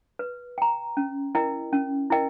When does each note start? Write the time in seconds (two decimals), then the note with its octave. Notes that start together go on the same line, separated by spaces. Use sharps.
0.19 B4
0.58 G5 A#5
0.97 C#4
1.35 E4 A#4 D#5 G5
1.73 C#4
2.10 E4 A#4 D#5 G5